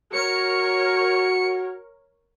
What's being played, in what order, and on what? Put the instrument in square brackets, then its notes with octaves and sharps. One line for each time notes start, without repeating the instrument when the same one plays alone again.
[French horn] F#4 [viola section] A#4 C#5 [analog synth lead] C#7